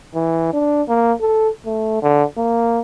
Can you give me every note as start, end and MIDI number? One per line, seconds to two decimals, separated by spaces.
0.14 0.50 52
0.53 0.82 62
0.88 1.13 58
1.21 1.49 69
1.66 2.00 57
2.02 2.24 50
2.37 2.81 58